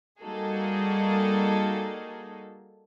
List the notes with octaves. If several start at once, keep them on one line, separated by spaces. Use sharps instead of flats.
G3 A#3 D#4 F#4 G#4 A4